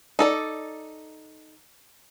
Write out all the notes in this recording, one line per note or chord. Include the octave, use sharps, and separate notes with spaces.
D#4 A4 D5